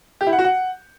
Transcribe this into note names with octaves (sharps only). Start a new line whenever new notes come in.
G4
E4
F#5
F#4
F#5